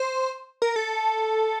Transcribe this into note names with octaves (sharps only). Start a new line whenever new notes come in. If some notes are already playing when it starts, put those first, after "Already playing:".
Already playing: C5
A#4
A4